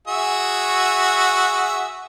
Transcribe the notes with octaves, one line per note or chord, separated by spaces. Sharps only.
F#4 G#4 E5